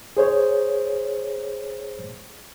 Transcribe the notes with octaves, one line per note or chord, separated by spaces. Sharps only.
G#4 C5 C#5